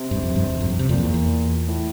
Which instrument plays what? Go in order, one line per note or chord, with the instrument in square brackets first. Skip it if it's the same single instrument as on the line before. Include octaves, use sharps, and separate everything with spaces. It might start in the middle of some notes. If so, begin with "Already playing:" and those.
Already playing: [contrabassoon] C3
[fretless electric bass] G2
F2
G2
E2
F2
G2
C3
[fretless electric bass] F2 [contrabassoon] A#2
[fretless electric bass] E2
E2
[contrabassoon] A2